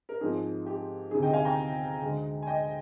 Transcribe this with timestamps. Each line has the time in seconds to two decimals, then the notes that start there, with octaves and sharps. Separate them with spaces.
0.09 A#4
0.20 G#2 F3 C4 G#4
0.66 G4
1.11 D2 C3 D#3 G#4
1.22 D#5 G5
1.33 F5 G#5
1.45 G5 A#5
2.02 D2 D3 G#3
2.43 G#5
2.47 D#5 G5